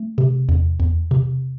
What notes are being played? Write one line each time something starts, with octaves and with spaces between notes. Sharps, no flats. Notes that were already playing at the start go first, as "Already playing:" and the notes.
Already playing: A3
C3
E2
E2
C3